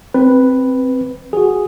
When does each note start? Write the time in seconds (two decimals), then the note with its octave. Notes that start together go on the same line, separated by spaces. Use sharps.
0.14 C4 B4
1.33 F#4 G#4